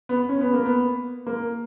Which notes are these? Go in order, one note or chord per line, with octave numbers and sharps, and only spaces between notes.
B3
C#4
B3
A#3
B3
A#3